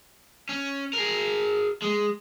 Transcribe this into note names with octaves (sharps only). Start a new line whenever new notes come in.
C#4
G#4 A#4
G#3